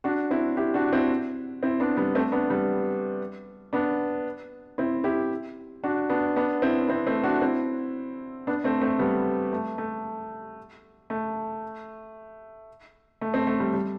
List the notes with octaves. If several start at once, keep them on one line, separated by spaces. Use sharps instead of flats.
D4 F#4
C4 E4
E4 G4
D4 F#4
C4 E4
C4 E4
B3 D4
G3 B3
A3 C4
B3 D4
G3 B3
B3 D4
C4 E4
E4 G4
D4 F#4
B3 D4
B3 D4
C4 E4
C4 E4
A3 C4
D4 F#4
C4 E4
B3 D4
A3 C4
A3 C4
G3 B3
A3
A3
A3
A3
A3 C4
A3
G3
G3